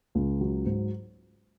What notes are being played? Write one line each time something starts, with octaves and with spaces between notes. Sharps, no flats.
C#2
F#3
G#2